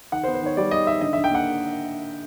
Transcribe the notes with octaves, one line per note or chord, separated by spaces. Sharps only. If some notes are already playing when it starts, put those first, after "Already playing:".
D#3 F#5
C5
B3
C5
D#3 C#5
G3 D5
D#3 D#5
D#3 E5
D3 D#5
D3 E5
G5
A#3 F#5